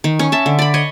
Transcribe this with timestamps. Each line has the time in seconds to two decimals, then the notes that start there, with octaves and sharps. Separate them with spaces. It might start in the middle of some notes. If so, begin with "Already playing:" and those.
0.04 D#3
0.19 C#4
0.32 E5 A5
0.46 D3
0.59 D5 B5
0.74 C#5 D#5